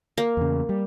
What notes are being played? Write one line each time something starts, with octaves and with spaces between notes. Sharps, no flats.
A#3
E2 C#3
G3